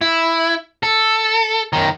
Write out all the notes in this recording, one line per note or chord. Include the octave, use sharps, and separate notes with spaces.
E4
A4
F#2 D#3